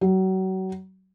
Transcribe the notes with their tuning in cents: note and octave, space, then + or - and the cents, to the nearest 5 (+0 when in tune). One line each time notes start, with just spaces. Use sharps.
F#3 +35